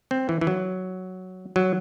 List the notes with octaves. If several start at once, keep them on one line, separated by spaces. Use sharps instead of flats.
C4
E3
E3
F#3
F#3